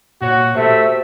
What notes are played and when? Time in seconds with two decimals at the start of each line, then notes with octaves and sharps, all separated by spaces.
0.21 A#2 F#4 C#5
0.55 A3 F#4 G4 C5 E5